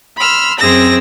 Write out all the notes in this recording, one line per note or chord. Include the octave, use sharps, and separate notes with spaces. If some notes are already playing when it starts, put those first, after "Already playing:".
B5 C6 E6 F6
F#2 C4 G#4 E6 A#6